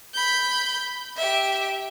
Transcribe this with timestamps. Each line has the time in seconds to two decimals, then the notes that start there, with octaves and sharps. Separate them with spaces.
0.14 B5 G6
1.17 G4 E5